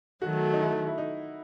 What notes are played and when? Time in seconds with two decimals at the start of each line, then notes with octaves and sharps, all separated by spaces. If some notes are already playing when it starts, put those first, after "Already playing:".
0.22 D#3 F#3 A3 F#4
0.53 D#4
0.60 E4
0.87 E4
0.98 D#4